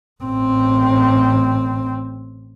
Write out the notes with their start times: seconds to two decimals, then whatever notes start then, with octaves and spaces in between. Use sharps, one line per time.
0.23 A1 C4